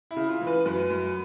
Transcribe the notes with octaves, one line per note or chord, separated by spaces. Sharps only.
E4
C#3
F4
E3
B4
F#2 B4
F#2